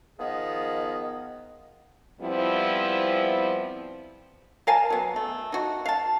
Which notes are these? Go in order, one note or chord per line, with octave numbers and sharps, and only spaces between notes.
D#3 F3 B3 G#4 D#5
F3 G3 B3 C4 E4
A#4 F5 G#5 A5
F#3 B3
A3
D#4 F#4
F5 A5